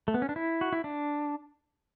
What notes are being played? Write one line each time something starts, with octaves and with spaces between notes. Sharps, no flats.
A3
B3
C#4
D4
E4
F#4
E4
D4